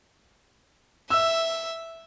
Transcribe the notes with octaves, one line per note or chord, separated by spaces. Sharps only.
E5 E6